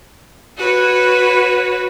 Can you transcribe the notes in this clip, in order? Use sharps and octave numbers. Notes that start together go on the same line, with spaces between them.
F#4 B4 C#5